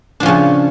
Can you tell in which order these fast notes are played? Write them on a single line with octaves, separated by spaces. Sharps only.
D4 F3 C#4 C#3